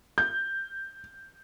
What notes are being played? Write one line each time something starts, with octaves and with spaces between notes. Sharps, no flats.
G6